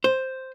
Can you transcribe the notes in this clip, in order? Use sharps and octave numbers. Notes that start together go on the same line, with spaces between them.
C5